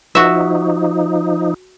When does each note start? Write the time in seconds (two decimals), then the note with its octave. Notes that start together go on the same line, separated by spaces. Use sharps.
0.15 F3 D#4 F#4 E5